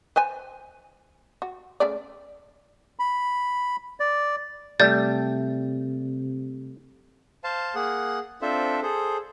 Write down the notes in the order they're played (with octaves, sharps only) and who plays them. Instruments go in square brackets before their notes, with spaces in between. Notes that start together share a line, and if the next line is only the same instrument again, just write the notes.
[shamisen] B4 C5 G#5
F#4
C#3 A3 D5
[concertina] B5
D5
[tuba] C3 [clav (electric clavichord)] G3 A3 [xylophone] D5 G6 A6
[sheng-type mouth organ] C5 F5 A5
A#3 G#4 F#5
C4 D4 F4 A4 C5 E5
G#4 A4 C5